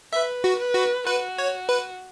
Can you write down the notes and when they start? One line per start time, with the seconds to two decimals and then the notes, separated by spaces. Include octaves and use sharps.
0.13 B4 E5
0.44 F#4
0.59 B4
0.75 F#4
1.07 F#4 B4
1.38 C#5
1.69 B4